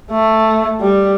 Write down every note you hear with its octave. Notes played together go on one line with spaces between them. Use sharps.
A3
G3